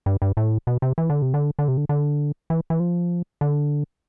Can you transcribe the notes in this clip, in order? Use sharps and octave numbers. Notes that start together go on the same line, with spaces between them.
G2
G2
A2
B2
C3
E3
D3
C3
D3
D3
C3
D3
D3
E3
E3
F3
D3